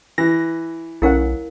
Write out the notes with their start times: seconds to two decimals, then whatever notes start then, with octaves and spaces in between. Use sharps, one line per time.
0.18 E3 A#6
1.02 B1 A3 C#4 E4 A#4 F5 F#5